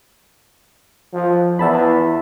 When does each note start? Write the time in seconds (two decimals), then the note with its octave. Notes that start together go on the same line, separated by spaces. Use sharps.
1.14 F3
1.59 E2 E5 A5 B5